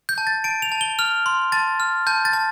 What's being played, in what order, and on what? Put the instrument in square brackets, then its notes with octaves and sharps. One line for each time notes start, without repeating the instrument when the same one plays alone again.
[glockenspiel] G6
A5
A6
A5 D7
F7
A5
G7
F6 F7
C6
A5 A6
F6
A5 G6
A6
A5